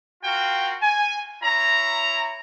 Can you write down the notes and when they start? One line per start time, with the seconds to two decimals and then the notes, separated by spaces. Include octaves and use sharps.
0.23 F4 F#4 A#4 F5 G5
0.82 G#5
1.42 E4 C#5 A#5